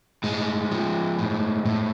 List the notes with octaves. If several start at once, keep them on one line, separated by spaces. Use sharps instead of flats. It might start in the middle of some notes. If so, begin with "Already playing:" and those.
A2 G#3
F3
A2
A2